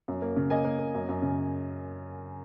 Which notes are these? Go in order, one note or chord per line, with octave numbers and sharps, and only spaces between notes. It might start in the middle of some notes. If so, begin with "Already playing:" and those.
F#2
A#3
C#3
A#3 D#5 G#5
A#3
A#3
F#2
F#2
C#3